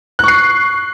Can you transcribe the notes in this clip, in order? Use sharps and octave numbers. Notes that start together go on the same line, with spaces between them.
C#6 F#6 C7